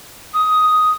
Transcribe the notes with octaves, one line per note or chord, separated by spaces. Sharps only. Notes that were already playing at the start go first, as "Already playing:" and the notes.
D#6